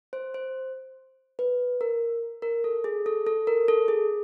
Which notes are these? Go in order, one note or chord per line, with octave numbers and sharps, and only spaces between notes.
C5
C5
B4
A#4
A#4
A4
G#4
A4
A4
A#4
A4
G#4